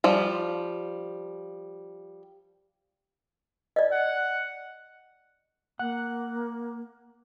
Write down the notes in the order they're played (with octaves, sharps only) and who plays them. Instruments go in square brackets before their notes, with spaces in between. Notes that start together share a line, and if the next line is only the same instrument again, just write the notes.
[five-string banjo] F3 G3
[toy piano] D5 D#5
[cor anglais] F#5
[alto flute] A#3 [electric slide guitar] F#5